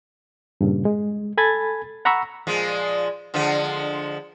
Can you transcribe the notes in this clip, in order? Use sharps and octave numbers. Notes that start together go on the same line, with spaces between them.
G2 A#2 C#3
G#3
A4 G#5 B5 G#6 A6
F#5 A#5 B5 C#6 E6
A#2 F3 G#3
D3 F3 G#3